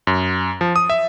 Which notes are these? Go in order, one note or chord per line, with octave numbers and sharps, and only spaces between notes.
F#2
F3
D#6
E5